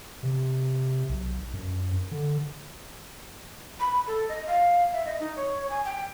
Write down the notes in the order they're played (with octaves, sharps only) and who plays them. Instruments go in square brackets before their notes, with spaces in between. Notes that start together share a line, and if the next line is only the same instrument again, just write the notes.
[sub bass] C3
B1
F#2
D3
[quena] B5
A4
D#5
F5
E5
D#5
D#4
C#5
G#5
G5